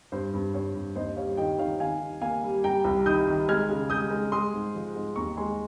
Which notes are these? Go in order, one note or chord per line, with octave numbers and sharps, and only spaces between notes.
G2 C5
G2
G2 C#5
G2
D#2 C5 D#5
G3 C#5 F5
D#3 D#5 G5
D#3 C#5 F5
D#3 F5 G#5
D#3
A#3 F5 G#5
G3
G3 G5 A#5
C2
D#3 D#6 G6
D#3
G#3 F6 G#6
C#3
G#3 D#6 G6
G#3
G#3 C6 D#6
G#2
F3
G#2
D#2 A#5 C#6
G#3 G#5 C6